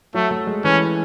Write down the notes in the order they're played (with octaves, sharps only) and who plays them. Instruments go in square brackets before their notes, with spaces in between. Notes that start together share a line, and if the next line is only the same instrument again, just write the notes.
[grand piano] F#3 [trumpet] A3
[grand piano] A3
G#3
[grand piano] E3 [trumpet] C#4